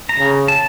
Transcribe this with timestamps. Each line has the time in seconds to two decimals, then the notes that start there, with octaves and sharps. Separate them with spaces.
0.09 A#5
0.18 C#3
0.48 A5